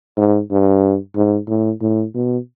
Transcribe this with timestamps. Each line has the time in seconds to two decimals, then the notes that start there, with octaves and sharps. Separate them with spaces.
0.17 G#2
0.51 G2
1.15 G#2
1.48 A2
1.81 A2
2.14 B2